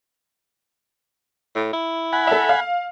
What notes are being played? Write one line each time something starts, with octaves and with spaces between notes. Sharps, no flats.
A2
E4
F#5 G#5 B5
A4 E5
F5